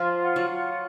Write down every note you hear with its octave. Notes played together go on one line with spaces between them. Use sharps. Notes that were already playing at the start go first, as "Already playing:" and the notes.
Already playing: F3 F4
F#5
F#3
F4